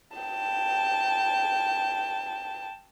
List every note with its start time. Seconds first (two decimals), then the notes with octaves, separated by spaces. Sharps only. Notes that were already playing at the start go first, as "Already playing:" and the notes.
0.18 G5 A5